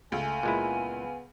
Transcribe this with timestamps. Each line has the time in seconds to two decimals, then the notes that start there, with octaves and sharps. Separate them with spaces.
0.12 C#2 A3 G#5
0.43 A#2 G#3 B3 E4